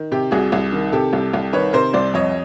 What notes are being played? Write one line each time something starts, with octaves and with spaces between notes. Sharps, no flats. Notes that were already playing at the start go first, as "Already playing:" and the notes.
Already playing: D#3
C3 G4
C2 F#4 G#4
C2
D#3
C3 G4 A4
C2
C2
D#3 B4 C#5
C3 A#4 C5
C2 C5 D5
F2 C#5 D#5